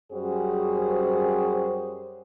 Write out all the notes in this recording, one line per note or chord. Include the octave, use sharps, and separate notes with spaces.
F#2 G3 C#4 F#4 G#4 C5